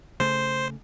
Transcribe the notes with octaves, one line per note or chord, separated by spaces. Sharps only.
C#3 A3 C5